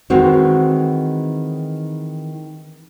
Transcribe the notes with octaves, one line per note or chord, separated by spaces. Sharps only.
D#3 E3 G#3 C4 F#4